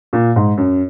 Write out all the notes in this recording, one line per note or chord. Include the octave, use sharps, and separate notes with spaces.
A#2
G#2
F#2